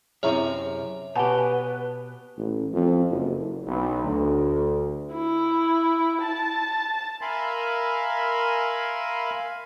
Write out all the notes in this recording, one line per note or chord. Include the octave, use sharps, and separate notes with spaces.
F#2 C3 E4 G#4 C#5 E5 A#5
B2 G4 B4 F#5 G#5 A5
A1
F2
F#1
B1
D2
E4
A5
A#4 E5 F5 G#5 B5 C6